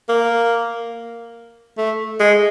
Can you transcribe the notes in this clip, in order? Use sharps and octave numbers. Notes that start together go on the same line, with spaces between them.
A#3
A3
G#3